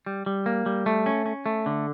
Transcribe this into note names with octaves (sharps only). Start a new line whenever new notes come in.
G3
G3
A#3
G3
A3
C#4
C#4
A3
D3